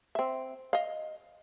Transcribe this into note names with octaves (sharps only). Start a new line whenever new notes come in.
C4 E5
D#5 F5